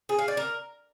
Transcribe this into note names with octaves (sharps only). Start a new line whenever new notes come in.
G#4
F5
D5
A#4